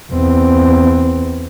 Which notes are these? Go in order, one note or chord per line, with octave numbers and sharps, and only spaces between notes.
E2 C4